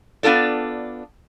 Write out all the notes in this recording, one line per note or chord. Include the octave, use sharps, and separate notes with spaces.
B3 D4 F4 A4 D5